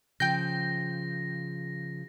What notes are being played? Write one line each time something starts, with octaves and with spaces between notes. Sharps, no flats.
C#3 F3 G5 G6 A#6